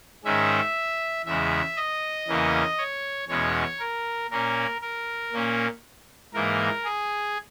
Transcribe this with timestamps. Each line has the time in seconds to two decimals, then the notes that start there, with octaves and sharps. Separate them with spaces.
0.24 G#2 D#3 G#3 C#4 E5
1.25 E2 C#3 G#3 E5
1.77 D#5
2.28 E2 C#3 E3 A#3 C#4
2.78 C#5
3.28 E2 B2 G#3 C#4 C#5
3.79 A#4
4.30 A#2 A#3 C#4 A#4
4.81 A#4
5.33 A#2 A#3 C#4
6.34 G#2 E3 A#3 A#4
6.84 G#4